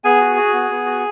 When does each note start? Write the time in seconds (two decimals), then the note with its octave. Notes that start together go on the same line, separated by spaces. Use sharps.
0.04 B3 G#4 G#5
0.21 F#4
0.37 F#4
0.53 B3
0.70 B3
0.86 F#4